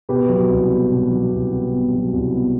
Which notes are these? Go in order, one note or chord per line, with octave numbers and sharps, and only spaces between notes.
B2 G4 B4
F#3
C2
B3
B2
F#3
C2
B3
B2
F#3
C2
B3